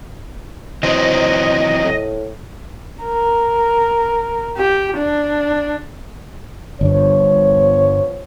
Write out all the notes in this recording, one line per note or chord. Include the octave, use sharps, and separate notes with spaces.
E3 F#3 C4 C5 D#5
A2
A#4
G4
D4
G1 G2 F3 B3 C#5